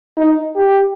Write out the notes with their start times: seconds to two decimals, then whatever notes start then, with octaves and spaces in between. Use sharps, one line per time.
0.17 D#4
0.55 G4